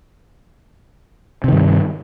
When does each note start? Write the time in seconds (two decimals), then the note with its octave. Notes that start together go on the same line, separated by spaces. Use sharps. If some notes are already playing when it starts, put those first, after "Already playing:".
1.44 C3
1.48 D#3
1.52 G2